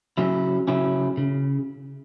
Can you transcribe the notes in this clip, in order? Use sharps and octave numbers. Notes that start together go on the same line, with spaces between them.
C#3 F#3 C#4 E4
C#3 F#3 C#4 E4
C#3